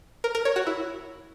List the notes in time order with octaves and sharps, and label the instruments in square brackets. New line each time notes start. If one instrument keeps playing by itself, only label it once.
[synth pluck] A#4
A#4
C#5
F#4
E4